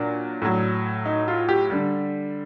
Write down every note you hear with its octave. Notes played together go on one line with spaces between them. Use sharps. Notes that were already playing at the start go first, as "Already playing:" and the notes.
Already playing: A#2 F#3 D4
A2 F#3
D#4
F4
G4
D3 G3